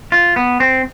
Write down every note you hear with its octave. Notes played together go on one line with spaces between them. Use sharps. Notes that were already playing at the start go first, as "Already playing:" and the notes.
F4
B3
C4